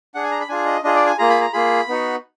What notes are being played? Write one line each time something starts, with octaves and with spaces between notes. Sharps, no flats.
D4 G#4 F#5
G#5
A#5
B5
D4 F4 G#4 G#5
D#5
D4 F4 G#4 D#5
D5
G#5
A#3 F4 G#4 A#5
B5
A#5
A#3 F4 G#4 B5
B3 D#4 F#4